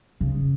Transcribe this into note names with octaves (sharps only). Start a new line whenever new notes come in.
C#3